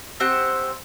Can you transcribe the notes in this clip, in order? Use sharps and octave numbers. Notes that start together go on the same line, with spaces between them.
C4 G4 C5 F#5